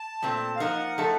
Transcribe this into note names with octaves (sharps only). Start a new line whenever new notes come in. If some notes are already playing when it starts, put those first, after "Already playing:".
Already playing: A5
A#2 A3 C4
F5
F3 A#3 D#4 A#4 F#5
F3 A3 D#4 A4